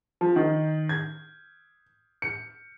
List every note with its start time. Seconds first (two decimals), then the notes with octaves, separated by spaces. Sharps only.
0.21 F3
0.36 D#3
0.89 G#6
2.22 C#7